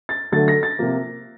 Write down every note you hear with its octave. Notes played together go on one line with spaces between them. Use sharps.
A6
D3 F#3 A3 A6
A#6
A6
C3 F3 A#3